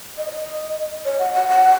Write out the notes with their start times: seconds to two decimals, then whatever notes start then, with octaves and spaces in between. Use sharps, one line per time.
0.17 D#5
0.28 C#5
0.31 D#5
1.05 C#5
1.19 F#5
1.34 F#5
1.48 F#5